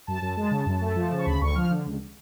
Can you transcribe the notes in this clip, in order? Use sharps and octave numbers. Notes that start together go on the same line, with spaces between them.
F#2 A5
F#2
G#3
C#3
F#2
A3
F3
C#3
C#6
D2 B5
D2 C#6
F3 F6
D3
C#2